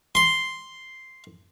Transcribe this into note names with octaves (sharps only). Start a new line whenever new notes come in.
C6